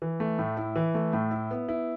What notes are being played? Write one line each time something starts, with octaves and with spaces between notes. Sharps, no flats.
E3
A3
A2
E4
E3
A3
A2
E4
B3
E4